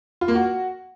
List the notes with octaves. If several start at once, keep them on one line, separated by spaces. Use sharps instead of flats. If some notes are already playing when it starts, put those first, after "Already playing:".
F4
A#3
F#4